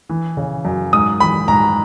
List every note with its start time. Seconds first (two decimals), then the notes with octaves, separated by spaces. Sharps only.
0.09 E3
0.37 C#3
0.65 F#2
0.93 G#2 D#6
1.20 E3 B5
1.48 G#2 A#5